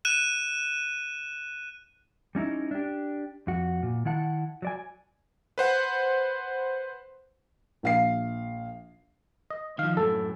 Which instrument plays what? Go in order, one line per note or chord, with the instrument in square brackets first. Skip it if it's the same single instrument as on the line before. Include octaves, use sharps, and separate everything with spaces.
[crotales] F#6 D#7 E7
[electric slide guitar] G3 C#4 D#4 E4
D4 G4
F2 F#4
A#2
D#3 E4 F#5 A5
F#3 D5 G#5
[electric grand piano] B4 C5 F#5
[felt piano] A#1 F5 C7
[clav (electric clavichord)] D#5
[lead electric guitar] D#3 F3 [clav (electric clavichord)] F5
[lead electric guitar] F#2 A2 [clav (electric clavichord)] A4